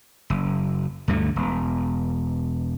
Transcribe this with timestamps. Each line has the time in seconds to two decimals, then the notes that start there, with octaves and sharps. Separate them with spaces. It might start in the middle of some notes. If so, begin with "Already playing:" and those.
0.30 F#1
1.08 D2 G2 D3 A3
1.36 E1